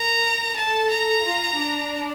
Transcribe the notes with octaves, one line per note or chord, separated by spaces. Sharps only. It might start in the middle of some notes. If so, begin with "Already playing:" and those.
Already playing: A#4 A#5
A4 A5
A#5
F4
D4